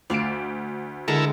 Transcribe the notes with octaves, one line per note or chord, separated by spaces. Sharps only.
D2 D5 F5 A5 D7
D3 G#3 E4 A4 A#4